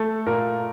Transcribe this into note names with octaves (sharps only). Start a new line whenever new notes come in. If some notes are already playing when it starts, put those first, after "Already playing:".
Already playing: A3 A4
A#2 A#4